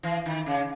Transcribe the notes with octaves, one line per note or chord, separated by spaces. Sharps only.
E3
D#3
C#3